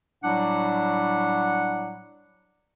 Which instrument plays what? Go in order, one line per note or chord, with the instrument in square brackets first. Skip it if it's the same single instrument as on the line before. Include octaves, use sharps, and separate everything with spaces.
[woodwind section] A2 F#3 G3 D4 F#5